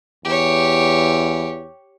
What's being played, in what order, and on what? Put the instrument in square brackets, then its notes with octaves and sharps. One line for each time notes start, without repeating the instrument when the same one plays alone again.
[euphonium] E2 [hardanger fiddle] G4 C#5